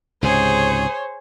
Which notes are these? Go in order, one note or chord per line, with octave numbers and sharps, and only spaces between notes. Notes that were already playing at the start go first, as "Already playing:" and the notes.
C#2 G#2 C3 G#4 C5 C#5